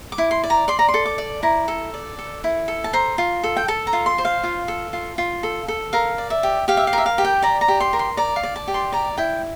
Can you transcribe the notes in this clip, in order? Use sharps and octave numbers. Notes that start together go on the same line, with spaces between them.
D6
E4
C6
D5
A#5
D5 C6
A#5
C6
A4
D6
D5
E4 A#5
A4
D5
A4
E4
A4
A5
C5 A#5
F4
A4
G5
A4 A5
A#5
F4
C6
C5
F5
F4
A4
F4
F4
A4
A4
A#4 F5
D5
E5
G4
G4 F5
E5
F5
A#4 E5
F5
G4
G5
D5 A#5
A#5
G4
C6
A#4
C6
D5 A#5
F5
D5
A5
G4
C6
D5 A#5
E4 G5